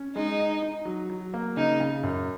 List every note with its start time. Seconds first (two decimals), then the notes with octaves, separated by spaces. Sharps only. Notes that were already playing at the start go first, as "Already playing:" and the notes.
Already playing: C#4
0.15 G#3 D#4
0.39 D#5
0.62 D#4
0.85 F#3
1.10 F#3
1.34 A#3
1.57 C#3 D#4
1.80 C#3
2.03 F#2